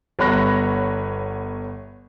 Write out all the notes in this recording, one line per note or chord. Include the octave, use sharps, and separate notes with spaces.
G1 B3 C#5 B5 F#6 A#6